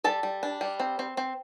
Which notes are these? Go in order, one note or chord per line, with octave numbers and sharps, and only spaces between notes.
G3 A4 A5
G3
D4
G3
C4
C4
C4